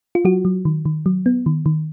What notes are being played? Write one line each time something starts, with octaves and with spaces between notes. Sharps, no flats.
F4
F#3 F#4
F#3
D#3
D#3
F#3
B3
D#3
D#3